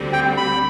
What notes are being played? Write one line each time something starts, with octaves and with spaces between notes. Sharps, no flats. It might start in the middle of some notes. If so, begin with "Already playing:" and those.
Already playing: D2 D3 G3 C4 F#4
G5
B5